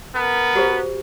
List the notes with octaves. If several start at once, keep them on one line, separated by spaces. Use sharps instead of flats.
B3 A#4
F#4 G4 C5